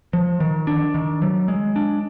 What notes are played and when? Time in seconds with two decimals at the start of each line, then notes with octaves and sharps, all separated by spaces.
0.13 F3
0.40 D#3
0.67 D4
0.94 D#3
1.22 F#3
1.48 G#3
1.76 D4